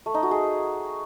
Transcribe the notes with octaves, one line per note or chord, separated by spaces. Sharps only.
A3
D#4
F#4
G#4